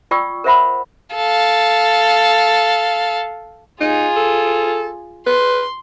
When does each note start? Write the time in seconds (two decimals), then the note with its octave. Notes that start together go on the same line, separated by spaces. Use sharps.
0.11 F4 D5 G5 C#6 D#6 E6
0.44 A#4 C5 C#5 E5 F#5 B5
1.15 A4 F5
3.81 D#4 F4 G#4
4.16 A4
5.27 B4 C6